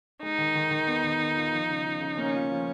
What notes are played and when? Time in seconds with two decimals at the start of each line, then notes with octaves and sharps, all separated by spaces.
0.22 G#3 D#4
0.38 D#3
0.55 D#3
0.71 D#3
0.87 B3
1.04 D#3
1.20 D#3
1.36 F4
1.52 F3
1.69 C#3
1.84 F3
2.01 C#3
2.17 A#3 C#4
2.34 F4
2.50 F3